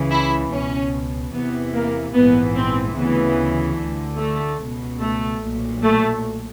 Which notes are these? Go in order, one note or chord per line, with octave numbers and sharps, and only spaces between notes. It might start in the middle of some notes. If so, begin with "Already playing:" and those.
Already playing: C#2 C#3 E3
E4
C#2 B2 C#4
E2 C3 E3 B3
A#3
A#1 G#2 E3 B3
C4
D2 C#3 E3 B3
D2 D3
A3
C#2 B2
A3
B1 A#2
A3